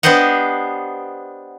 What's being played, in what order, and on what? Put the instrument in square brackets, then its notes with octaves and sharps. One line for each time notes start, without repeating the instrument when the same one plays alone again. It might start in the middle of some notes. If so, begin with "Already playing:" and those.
[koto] B3 D4 G4 C5 D#5 F#5